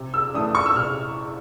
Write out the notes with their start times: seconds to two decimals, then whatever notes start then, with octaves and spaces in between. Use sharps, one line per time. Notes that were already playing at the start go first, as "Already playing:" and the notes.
Already playing: C3
0.14 E6
0.34 E3 A3 D4 D#6
0.55 C#6
0.66 E6
0.75 C3 F6